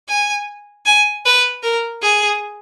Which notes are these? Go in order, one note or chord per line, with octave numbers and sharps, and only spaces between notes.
G#5
G#5
B4
A#4
G#4